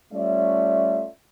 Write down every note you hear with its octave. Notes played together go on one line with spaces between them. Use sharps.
G3 A3 C#4 F4 D5 E5